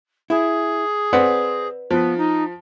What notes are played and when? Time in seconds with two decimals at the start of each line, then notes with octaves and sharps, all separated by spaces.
0.30 E4 G#4
1.13 C4 B4 D5 F#5
1.91 F3 B3
2.18 D#4